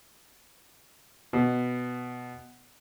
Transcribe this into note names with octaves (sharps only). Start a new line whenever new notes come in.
B2